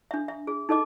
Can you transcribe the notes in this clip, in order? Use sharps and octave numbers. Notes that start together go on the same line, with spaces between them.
D4 E5
E5
G#4
D#4 A4 D#5 D6